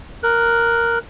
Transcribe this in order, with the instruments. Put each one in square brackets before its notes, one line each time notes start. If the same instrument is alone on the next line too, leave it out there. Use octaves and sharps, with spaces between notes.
[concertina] A#4 F#6